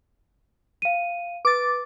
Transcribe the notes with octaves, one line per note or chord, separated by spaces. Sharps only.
F5 D#7
B4 D6 A6